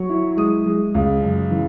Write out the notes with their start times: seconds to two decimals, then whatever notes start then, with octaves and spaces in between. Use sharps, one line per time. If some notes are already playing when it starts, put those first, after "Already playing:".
Already playing: F#3 C#6
0.09 E4
0.37 G#3 D#6
0.66 G#3
0.95 C#2
1.23 F#2
1.51 E3